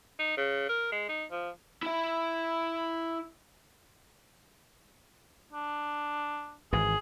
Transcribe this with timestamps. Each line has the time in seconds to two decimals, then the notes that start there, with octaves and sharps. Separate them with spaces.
0.19 D#4
0.37 C#3
0.69 A#4
0.92 G#3
1.09 D#4
1.31 F3
1.83 E4 E5
5.53 D4
6.73 G#1 G#2 E3 G#4